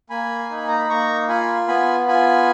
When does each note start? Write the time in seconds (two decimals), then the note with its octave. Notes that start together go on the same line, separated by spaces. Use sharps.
0.10 A#3 G#5 B5
0.50 D#4
0.57 G#5
0.68 A#5
0.79 B5
0.89 A#3 A#5 C#6
1.29 F4 G#5 B5
1.68 B3 G#5 B5
2.08 F4 G#5 B5